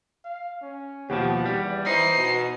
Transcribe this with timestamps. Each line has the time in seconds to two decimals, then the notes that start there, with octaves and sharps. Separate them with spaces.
0.25 F5
0.62 C#4
1.10 D#2 B2 F3 G4 F#5
1.46 E2 G3
1.86 E3 D#4 C5 C7
2.16 B2